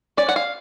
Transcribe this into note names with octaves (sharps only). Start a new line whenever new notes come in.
C#4 D5
F#5
F5